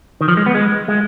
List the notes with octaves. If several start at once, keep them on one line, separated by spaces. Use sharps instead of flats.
D#3
F3
G#3
B3
G#3
G#3